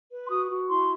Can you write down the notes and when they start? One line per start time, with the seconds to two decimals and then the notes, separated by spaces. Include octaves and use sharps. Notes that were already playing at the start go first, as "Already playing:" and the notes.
0.11 B4
0.25 C6
0.30 F#4 D#6
0.51 F#4
0.69 E4 C6